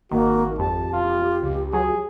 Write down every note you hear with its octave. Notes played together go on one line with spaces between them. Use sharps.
G#1 D#3 A#3 F#4
F2 G4 A5
E1 F4
C#2
F#3 G#4